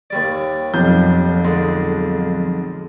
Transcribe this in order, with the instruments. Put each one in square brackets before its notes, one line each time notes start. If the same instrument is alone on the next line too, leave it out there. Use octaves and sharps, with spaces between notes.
[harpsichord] D#2 G3 D5
[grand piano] B1 F2 G6
[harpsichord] D3 G#3